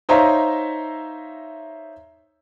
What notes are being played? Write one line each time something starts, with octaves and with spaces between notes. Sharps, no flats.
D#4 C5 C#5 E5 F5 A#5